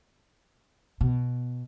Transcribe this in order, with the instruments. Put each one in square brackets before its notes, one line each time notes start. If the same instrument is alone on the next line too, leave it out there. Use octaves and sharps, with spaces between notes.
[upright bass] B2